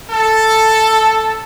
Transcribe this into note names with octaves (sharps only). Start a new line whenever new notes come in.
A4